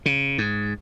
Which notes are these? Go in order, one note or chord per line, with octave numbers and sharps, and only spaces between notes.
C#3
G#2